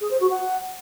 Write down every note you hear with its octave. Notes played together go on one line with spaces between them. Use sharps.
G#4
C5
F#4
F#5